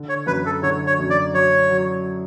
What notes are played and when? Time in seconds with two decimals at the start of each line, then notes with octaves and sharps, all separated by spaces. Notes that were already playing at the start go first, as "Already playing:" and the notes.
Already playing: D3
0.09 C#5
0.27 F#2 B4
0.46 A4
0.63 D3 C#5
0.87 C#5
0.99 F#2
1.10 D5
1.34 F#3 C#5
1.70 F#3